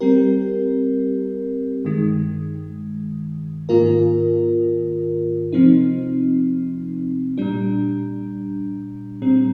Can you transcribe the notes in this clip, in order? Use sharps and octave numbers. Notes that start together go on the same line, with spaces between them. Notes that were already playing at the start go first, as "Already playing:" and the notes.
G3 C4 G4 A#4
G2 D#3 G#3
G#2 D#3 A#3 F4 A#4
C3 F3 C4 D#4
A#2 G3 D4
A#2 G3 C4